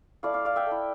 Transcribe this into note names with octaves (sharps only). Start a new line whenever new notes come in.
A3 E4 D5 F5
D5 F5
D5 F5
E5 G5
A3 E4